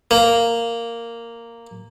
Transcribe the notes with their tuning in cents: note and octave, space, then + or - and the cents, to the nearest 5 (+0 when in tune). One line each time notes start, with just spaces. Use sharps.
A#3 -5